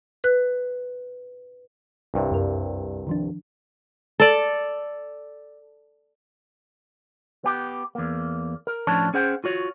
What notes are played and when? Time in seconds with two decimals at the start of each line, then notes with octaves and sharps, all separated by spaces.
0.24 B4 F#6
2.14 C2 G2 C3
2.31 F#2 A#4
3.07 D#3 F3 D4
4.20 A4 D5
7.44 B3 G4
7.95 E2 A#3
8.67 A#4
8.87 A2 F3 C#4 D4 C#5 A5
9.14 C#4 G#4 C5 F#5 G5
9.44 F4 F#4 C#5